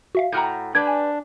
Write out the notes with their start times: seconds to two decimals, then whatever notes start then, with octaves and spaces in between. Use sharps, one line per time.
0.15 F#4 E5 F5
0.32 A2 F#4 G5 A#5 F6 G6
0.75 D4 G4 B4 D5 G#6
0.87 G#5